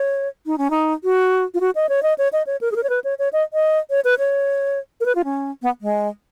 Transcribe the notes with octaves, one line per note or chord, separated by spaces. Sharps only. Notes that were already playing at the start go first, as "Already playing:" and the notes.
Already playing: C#5
D#4
C#4
D#4
F#4
F4
F#4
D#5
C#5
D#5
C#5
D#5
C#5
A#4
G#4
A#4
C#5
B4
C#5
C#5
D#5
D#5
C#5
B4
C#5
A#4
B4
F4
C#4
B3
G#3